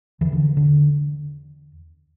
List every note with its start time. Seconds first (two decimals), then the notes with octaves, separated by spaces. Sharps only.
0.21 E2 D3 E3
0.33 D3
0.57 D3